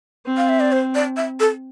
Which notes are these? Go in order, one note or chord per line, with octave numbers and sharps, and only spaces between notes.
C4
F5
E5
D5
C5
D5
E5
A4